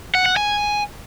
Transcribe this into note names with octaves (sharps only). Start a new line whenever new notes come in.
F#5
F#5
G#5